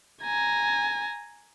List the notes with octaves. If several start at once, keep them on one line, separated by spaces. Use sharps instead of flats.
G#5 A#5